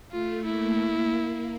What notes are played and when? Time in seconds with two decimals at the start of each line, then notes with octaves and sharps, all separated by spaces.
0.11 A3 F4
0.44 A#3 E4
0.78 A#3